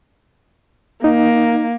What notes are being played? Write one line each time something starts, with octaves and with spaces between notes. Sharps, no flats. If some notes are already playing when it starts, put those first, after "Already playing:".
A#3 D#4